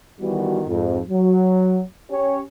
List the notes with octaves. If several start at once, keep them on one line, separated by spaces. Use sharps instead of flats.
D#3 E3 G3 B3 F#4
F2 G#2
F#3
C#4 G4 C#5